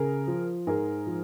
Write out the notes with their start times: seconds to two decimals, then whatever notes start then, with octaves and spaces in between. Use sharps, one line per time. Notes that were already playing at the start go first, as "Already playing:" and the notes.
Already playing: C#3 G#4 A#4
0.27 F3
0.67 G#2 G#4 A#4
1.07 F3